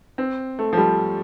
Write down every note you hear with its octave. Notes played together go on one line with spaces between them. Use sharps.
C4
A3
F3
G3